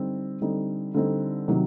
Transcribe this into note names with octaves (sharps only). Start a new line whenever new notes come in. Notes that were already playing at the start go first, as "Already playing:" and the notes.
Already playing: D3 G3 C4 D#4
D3 G3 C4 D#4
D3 G3 C4 D#4
C3 D#3 F#3